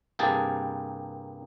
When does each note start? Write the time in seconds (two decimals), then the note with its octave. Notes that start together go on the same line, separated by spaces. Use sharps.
0.19 C2 G2 A#3 G4 G#4 A5